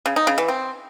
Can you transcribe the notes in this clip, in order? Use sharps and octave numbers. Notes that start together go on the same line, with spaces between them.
C#3
D#4
C#3
E3
C4